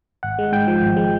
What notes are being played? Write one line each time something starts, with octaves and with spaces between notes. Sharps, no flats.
G#1 F#5
G#3
G#2 G5
F3
G#1
G#3